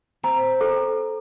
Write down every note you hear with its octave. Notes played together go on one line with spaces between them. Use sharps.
C4 A#5
A4